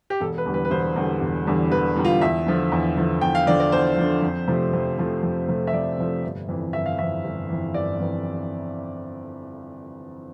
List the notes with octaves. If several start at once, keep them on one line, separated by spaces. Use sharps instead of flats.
G4
E1 A4
B4
E2 D3 G3
B4
B4
E1 C5
E2 D3 G3
E1
E2 D3 G3
E1 B4
E2 D3 G3
F4
E2 E5
D3 F3
E2
D3 F3
E2 G5
F5
D3 F3 D5
D5
E2 C5
D3 F3
F2
C3 F3 A3
F2
C3 F3 A3
F2
C3 F3 A3
E5
F2 D5
C3 F3 A3
G1
F2 E3
G1 E5
F5
F2 E3 E5
G1
F2 E3
G1 D5
F2 E3